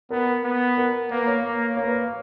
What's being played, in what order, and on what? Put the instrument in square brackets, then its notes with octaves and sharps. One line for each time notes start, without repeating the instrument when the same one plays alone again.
[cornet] B3 [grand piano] A#4
[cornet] B3
[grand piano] A#4
[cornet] A#3 [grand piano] B4
[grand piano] C#5
[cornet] A#3
[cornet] A#3 [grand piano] C#5
[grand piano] B4
C#5